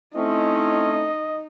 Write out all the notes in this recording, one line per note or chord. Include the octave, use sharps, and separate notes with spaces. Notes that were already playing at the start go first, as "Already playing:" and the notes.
A3 C4 C#4 D#4 E4 D#5